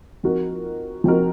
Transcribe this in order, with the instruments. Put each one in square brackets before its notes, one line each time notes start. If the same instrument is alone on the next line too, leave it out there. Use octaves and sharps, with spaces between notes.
[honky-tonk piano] F3 C4 D#4 F#4 A#4
F3 C4 D#4 F#4 A#4